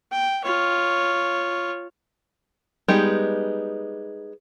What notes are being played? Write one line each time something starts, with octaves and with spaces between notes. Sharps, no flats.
G5
F4 C#5
G3 G#3 B3 D#4 G4